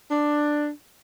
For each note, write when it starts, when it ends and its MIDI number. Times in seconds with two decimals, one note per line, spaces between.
0.10 0.69 62